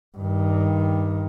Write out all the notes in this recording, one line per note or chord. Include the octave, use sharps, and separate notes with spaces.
G2 D#3